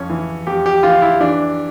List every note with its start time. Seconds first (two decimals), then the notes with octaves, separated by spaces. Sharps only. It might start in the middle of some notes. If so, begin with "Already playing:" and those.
Already playing: F2 C#4
0.10 E3
0.47 F2 G4
0.66 G4
0.83 E3 F4
1.02 E4
1.20 E3 D4